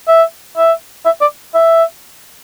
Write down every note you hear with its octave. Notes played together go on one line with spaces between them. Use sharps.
E5
E5
E5
D5
E5